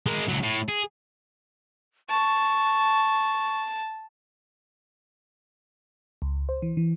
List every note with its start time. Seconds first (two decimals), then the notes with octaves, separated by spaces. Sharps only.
0.06 G#3 A#4
0.28 C#2 F#3
0.43 A2
0.69 G#4
2.10 A5 C#6
6.22 C#2
6.49 C5
6.62 E3
6.77 E3